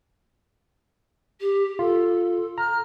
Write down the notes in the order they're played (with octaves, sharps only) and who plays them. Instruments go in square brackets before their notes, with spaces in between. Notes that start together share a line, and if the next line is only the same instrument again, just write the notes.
[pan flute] G4
[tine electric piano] F4 [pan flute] A4
[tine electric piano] A#5 [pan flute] F6